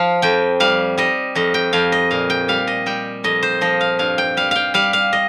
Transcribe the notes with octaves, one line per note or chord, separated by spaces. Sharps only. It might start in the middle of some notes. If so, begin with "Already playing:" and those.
Already playing: F3 F5
F2 G5
G3 F5
G3 D#5
F2 D#5
G5
F2 F5
D#5
A#2 F5
G5
G3 F5
D#5
G3 G5
F2 D#5
C5
F3 D#5
F5
G2 F5
G5
G3 F5
F5 G5
G3 F5
F5
D#5